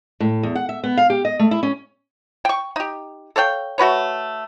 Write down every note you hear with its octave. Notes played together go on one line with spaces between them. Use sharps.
A2
E2
F#5
E5
B3
F5
G4
D#5
A3
E4
C#4
G5 C#6
D#4 G4
A4 C#5 F5 G5
A3 F#4 B4 C#5